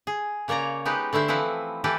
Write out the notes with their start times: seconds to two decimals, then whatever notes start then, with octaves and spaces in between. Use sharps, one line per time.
0.07 G#4
0.48 C#3 A#3 C#5 D5 A#5
0.85 G#3 B3 D#4 G4 B4
1.13 D3 A3 E4 C5 E5
1.28 E3 F3 C4 E4 B4
1.84 E3 G4 A4 B4